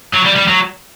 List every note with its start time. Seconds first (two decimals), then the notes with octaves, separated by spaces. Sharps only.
0.13 F#3
0.25 G3
0.36 G3
0.48 F#3